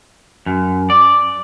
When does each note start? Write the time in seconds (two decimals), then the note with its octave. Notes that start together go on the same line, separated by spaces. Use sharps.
0.46 F#2
0.90 D5